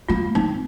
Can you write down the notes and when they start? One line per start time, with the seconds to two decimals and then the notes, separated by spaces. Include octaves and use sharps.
0.08 A#3 F4
0.35 C4 D#4